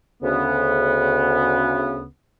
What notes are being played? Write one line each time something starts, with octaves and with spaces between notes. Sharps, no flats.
D2 C#3 B3